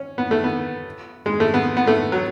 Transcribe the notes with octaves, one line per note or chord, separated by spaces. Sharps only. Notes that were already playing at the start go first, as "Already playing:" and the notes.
Already playing: C#4
B3
A3
B3
G#3
A3
B3
B3
A3
F#3